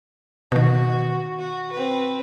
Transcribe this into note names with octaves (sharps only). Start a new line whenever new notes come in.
B2 D#3 F#4
F#4
C4 B4